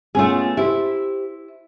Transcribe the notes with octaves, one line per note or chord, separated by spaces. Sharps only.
A3 B3 C#4 F4 G#4
E4 G4 C5